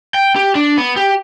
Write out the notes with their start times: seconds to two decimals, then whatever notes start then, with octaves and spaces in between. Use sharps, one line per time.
0.14 G5
0.36 G4
0.55 D4
0.77 B3
0.96 G4